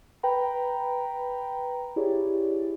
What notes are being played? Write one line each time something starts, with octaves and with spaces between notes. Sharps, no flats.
B4 G5 A#5 B5
E4 G4 G#4 C#5 D5